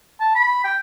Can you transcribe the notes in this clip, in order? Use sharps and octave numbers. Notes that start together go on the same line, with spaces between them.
A5
B5
G5